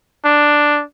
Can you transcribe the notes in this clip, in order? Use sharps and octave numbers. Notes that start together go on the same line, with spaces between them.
D4